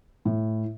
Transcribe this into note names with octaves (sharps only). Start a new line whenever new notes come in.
A2